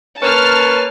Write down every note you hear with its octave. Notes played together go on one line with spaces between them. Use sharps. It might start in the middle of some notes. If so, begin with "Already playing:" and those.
A#3 C#4 B4 A5 F6